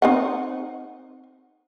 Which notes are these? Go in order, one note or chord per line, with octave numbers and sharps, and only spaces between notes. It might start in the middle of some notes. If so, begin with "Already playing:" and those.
C4 D#4 F#5